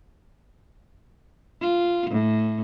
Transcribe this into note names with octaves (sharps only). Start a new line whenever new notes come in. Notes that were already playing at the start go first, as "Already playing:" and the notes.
F4
A2